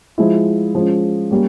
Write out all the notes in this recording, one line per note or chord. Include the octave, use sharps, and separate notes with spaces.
F3 G#3 E4
F3 G#3 C#4
G3 A#3 C#4